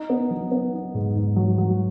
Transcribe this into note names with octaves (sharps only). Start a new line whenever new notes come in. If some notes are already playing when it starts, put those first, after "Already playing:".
Already playing: D#4
B3
F#3
B3
D#4
G#2
G#2
F#3
F#3